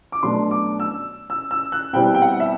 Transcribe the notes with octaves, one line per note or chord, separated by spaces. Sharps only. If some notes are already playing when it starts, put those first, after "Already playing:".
D6
B2 F#3 A3 D4 C6
D6
E6
E6
E6
F#6
B2 G3 C4 E4 G5
G5
F#5
E5